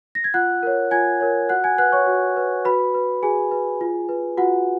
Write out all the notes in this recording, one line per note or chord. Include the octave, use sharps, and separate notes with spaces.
A#6
G#6
F4 F#5 F#6
A#4 C#5
F4 G#5 G#6
A#4 C#5
F#4 F#5 F#6
G#5 G#6
B4 F#5 F#6
C#5 C#6
F#4
B4
F#4 B4 B5
B4
F#4 G#4 G#5
B4
F4
B4
F4 F#4 F#5